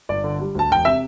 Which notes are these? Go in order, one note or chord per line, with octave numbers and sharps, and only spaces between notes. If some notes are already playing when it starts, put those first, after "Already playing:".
G1 D5
D3
G3
D2 A5
E1 G5
C3 E5